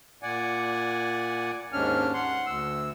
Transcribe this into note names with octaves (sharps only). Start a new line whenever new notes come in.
A#2 D5 F#5 G#5
D#2 G#2 C#4 D4 F6
F#5 C6
D2 E6